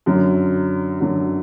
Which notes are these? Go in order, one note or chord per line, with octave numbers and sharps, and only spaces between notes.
F#2 D3 F#3
F#2 D3 F#3